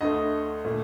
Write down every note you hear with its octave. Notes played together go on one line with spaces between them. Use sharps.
D2 D3 A3 D#5
A#2 A3